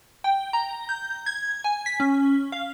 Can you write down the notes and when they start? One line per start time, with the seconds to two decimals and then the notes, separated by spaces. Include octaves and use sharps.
0.24 G5
0.53 A#5
0.89 G6
1.26 G#6
1.64 G#5
1.86 B6
2.00 C#4
2.52 F5